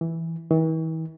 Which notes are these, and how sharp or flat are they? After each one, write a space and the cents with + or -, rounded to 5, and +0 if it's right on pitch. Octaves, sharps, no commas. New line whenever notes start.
E3 -5
E3 -45